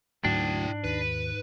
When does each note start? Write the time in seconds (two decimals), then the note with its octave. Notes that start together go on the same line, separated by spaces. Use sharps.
0.25 D2 G#2 F#3 D4 E4 G5
0.84 D#2 B4